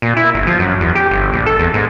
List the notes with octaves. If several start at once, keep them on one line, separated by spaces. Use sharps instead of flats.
A#2
E4
G1
F3
F#2
E2
G4
G1
A#1
A4
E2
G#2